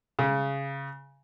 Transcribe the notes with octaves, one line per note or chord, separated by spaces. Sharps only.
C#3